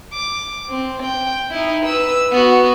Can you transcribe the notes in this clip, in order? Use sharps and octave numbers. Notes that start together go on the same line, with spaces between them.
D6
C4
G5
D#4 E4
B4 E6
B3 F#4